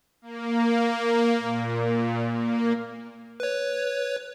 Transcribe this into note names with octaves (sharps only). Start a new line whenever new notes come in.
A#3
A#2
A#3
B4 C#5